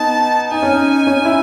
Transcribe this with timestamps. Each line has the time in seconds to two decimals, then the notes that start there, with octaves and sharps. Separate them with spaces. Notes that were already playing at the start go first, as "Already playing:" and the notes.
Already playing: B3 D#4 A5
0.51 D#4 G#5
0.63 C#4
0.74 D#4
1.07 C#4
1.25 E4